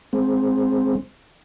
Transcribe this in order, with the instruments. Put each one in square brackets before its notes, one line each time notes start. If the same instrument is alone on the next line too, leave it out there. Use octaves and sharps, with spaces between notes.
[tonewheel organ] G#3 C4